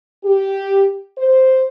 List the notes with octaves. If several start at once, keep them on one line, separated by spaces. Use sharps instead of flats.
G4
C5